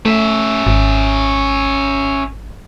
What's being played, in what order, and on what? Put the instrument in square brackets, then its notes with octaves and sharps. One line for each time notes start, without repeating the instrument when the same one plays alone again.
[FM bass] A3 [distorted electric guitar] C#4 E5
[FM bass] G#1